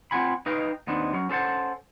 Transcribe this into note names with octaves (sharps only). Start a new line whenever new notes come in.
C4 F4 F#5 G#5 B5
D#4 B4 D#5 F5 G5
D#2 B3 C4 D4 D#4
F#3 C#4
C#4 A4 C5 F#5 A5